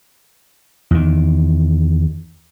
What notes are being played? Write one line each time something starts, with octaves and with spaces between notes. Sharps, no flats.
E2 D#3